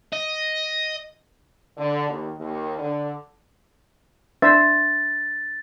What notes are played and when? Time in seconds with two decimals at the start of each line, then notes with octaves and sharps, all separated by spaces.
0.13 D#5
1.78 D3
2.10 D#2
2.39 D#2
2.79 D3
4.42 D4 C5 E5 A6